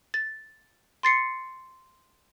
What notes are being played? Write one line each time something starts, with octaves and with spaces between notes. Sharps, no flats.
A6
C6 A6 C7 C#7